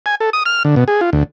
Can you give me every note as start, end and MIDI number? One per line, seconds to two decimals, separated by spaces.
0.06 0.15 80
0.20 0.30 69
0.33 0.43 87
0.46 0.63 89
0.65 0.75 50
0.76 0.84 47
0.88 1.01 68
1.01 1.10 65
1.13 1.24 38